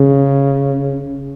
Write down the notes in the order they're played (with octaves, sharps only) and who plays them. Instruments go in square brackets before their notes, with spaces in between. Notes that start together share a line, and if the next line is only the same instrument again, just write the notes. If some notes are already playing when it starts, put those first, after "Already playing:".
Already playing: [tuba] C#3